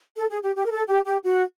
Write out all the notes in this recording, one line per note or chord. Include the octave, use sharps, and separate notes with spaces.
A4
G#4
G4
G4
A#4
A4
G4
G4
F#4